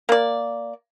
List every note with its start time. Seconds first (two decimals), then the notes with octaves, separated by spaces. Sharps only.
0.09 A#3 D5